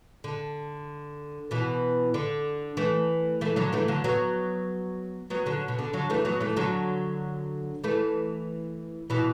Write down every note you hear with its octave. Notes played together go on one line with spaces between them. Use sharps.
D3
B2 E3
D3
E3 A3
E3 A3
D3 F#3
E3 A3
D3 F#3
F#3 B3
F#3 B3
D3 F#3
B2
D3
D3 F#3
E3 A3
F#3 B3
E3 A3
D3 F#3
E3 A3
B2 E3